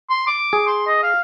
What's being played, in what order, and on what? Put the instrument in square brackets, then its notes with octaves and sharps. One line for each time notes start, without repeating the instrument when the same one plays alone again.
[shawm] C6
D6
[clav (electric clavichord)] G#4
[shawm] C6
D#5
F5